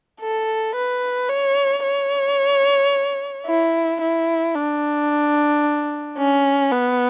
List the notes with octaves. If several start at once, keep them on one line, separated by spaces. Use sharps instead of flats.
A4
B4
C#5
C#5
E4
E4
D4
C#4
B3